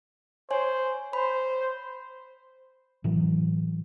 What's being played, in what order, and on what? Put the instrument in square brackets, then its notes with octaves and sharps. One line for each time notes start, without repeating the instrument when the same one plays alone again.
[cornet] C5 [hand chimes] C#5 G#5
[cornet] C5 [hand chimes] B5
[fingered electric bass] A2 E3 F#3